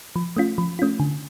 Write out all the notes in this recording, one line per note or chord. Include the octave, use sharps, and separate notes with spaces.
F3
A3 C#4 F4
F3
A3 C#4 F4
D3